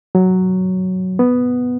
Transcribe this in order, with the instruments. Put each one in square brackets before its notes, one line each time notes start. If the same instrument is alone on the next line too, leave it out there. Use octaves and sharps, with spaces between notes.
[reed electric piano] F#3
B3